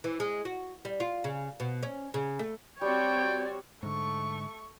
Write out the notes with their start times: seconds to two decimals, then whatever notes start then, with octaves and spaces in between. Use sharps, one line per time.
0.04 E3
0.20 G#3
0.45 F#4
0.85 G3
1.00 F4
1.24 C#3
1.60 B2
1.83 C#4
2.14 C#3
2.39 A3
2.81 G3 C4 F#4 C#5 D5 G5
3.83 G#2 D3 A3 C#6